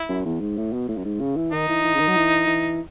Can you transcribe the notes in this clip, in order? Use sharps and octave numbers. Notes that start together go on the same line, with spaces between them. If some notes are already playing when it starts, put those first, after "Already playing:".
Already playing: E4
F#2
E2
G#2
A2
B2
A2
F#2
G#2
C#3
E3
D#3 D#4
E3
E3
C#3
D#3
F#3
E3
E3